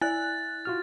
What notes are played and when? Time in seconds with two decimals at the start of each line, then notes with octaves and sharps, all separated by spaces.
0.01 E4 D5 G#5 F#6 A6
0.65 F4 F#4 F6